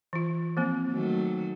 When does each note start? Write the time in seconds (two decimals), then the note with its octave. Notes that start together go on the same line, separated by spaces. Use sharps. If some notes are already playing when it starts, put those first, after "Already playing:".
0.13 E3 F4
0.57 F3 A#3 C4
0.91 D#3 F#3 A3